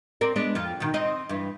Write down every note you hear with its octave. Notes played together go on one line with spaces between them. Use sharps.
C4 A#4 D5
G#3 B3 D4
F2 F4
B2 D#3
C4 D#4 D#5
G2 E3